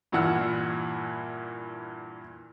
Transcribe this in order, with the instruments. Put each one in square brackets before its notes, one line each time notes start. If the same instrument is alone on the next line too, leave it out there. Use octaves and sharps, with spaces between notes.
[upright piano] G2 A#2 E3 F#5 E6 F6